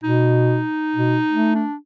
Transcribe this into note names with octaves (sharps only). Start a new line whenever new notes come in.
B2 D#4
B2
A3
D4